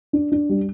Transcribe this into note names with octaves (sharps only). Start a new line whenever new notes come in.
D4
D4
G3